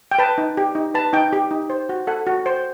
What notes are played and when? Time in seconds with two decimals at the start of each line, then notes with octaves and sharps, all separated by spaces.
0.11 G5
0.19 B4 A5
0.38 D#4
0.57 G4
0.75 D#4
0.94 B4 A5
1.13 D#4 G5
1.33 G4
1.51 D#4
1.70 C5
1.89 F#4
2.07 A4 F#5
2.27 F#4
2.46 C5